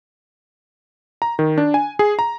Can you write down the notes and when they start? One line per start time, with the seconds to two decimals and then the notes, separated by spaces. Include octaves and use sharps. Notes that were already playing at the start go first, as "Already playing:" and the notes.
1.22 A#5
1.39 D#3
1.58 D4
1.74 G#5
1.99 G#4
2.19 A#5